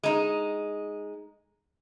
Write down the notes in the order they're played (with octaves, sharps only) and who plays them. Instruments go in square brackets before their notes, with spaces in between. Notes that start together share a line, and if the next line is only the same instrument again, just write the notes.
[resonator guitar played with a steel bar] G#3 D#4